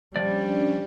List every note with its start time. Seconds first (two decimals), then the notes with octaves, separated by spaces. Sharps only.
0.16 F3 G3 C#4 D4 D5